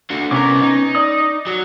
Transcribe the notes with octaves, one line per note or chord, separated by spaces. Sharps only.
D3 F#4
C2 B3 C#4 A#4 D6
D#4
D5 D#6
F#3